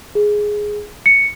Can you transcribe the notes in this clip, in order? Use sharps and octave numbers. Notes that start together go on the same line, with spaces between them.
G#4
C#7